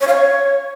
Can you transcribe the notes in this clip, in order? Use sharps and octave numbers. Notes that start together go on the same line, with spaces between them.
C#5
F5
C#5